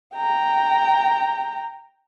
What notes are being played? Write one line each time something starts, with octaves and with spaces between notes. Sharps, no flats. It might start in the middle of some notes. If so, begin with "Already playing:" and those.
G5 A#5